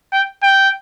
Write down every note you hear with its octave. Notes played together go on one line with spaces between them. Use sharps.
G5
G5